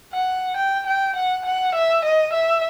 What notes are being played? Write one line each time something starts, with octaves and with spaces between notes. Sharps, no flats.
F#5
G5
G5
F#5
F#5
E5
D#5
E5